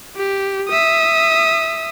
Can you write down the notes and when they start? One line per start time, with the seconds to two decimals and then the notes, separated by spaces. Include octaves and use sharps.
0.16 G4
0.69 E5 D#6